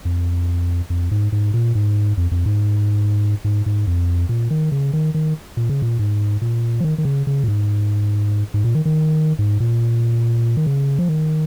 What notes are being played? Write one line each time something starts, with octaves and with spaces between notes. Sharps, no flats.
F2
F2
G#2
G#2
A#2
G#2
F2
F2
G#2
G#2
G#2
F2
A#2
D#3
C#3
D#3
D#3
A#2
C#3
A#2
G#2
A#2
F3
D#3
D#3
C#3
C#3
A#2
G#2
G#2
A#2
D#3
D#3
G#2
A#2
D#3
C#3
F3
D#3